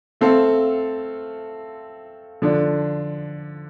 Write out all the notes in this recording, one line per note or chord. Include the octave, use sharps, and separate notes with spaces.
A3 C4 A4 F5
D3 F3 D4